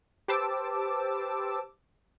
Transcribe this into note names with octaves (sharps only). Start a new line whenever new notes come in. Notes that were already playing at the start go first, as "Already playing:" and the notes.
G4 B4 C5 A5 D6 E6